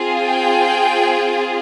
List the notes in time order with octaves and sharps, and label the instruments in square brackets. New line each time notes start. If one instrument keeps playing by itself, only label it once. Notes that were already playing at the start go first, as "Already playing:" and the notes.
Already playing: [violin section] C4 F4 G#4
G5